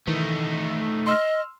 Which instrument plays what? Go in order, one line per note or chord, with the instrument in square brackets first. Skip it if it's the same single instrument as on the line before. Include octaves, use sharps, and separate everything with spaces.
[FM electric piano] D#3 E3 [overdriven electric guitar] A3 D#4
[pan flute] D#5 [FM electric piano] C6 E6 F6